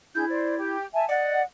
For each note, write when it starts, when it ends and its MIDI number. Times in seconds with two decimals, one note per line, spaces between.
0.15 0.24 62
0.15 0.76 64
0.15 0.24 68
0.15 0.24 91
0.29 0.55 72
0.29 0.55 74
0.57 0.83 67
0.94 1.05 76
0.94 1.05 80
0.94 1.05 81
1.09 1.42 74
1.09 1.42 75
1.09 1.42 78